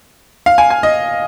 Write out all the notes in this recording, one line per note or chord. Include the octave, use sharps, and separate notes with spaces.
F5
G#5
G#5
D#5